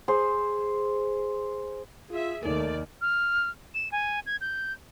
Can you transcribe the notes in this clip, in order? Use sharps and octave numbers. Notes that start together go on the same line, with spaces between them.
G#4 C5
F4 G#4 E5
D#2 D#3 A3 D#4 A#4 D5
F6
E7
G#5
G#6
G6